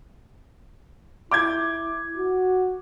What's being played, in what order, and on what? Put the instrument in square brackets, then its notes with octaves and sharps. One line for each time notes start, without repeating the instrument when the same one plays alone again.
[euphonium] E4 [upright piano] D6 G6 G#6
[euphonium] F#4